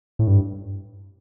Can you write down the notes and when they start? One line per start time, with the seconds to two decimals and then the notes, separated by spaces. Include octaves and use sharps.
0.19 A2
0.27 G2